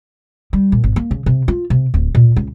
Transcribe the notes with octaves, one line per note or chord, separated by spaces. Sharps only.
G3
A#2
G#1
A#3
C#3
C3
F4
C3
D1
A#2
C#2